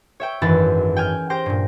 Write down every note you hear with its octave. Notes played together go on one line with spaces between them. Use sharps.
C#5 E5 G5
G#1 F#2 E3 B4 A6
G5 G#5 F6 G#6
G4 C5 G5 A#6
G2 A#2